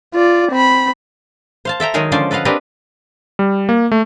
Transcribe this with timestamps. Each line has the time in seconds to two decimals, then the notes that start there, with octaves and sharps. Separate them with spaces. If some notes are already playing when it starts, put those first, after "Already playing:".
0.14 F4 D5
0.52 C4 B5
1.65 C5 F5 A5
1.80 A4 E5 G5 A#5
1.94 D#3 F#3 G#3 D#4 G#4 A#4
2.12 D3 F3 G#3 C#4 C5 D5
2.31 A4 B4 D#5 F5 F#5
2.45 C4 D4 G4 A#4 B4 D#5
3.39 G3
3.69 A#3
3.92 A3